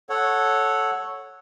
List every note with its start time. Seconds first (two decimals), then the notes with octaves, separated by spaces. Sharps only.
0.09 A4 C#5 F#5